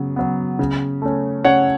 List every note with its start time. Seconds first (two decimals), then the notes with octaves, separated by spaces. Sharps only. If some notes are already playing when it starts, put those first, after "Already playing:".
Already playing: C#3 F#3 B3
0.16 F#3 B3
0.59 C#3
1.02 A3 C#4
1.45 C#3 C#5 F#5